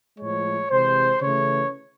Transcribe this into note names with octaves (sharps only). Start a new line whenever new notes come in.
A2 F3 G#3 C#5
C3 E3 G#3 C5
C#3 E3 A3 C#5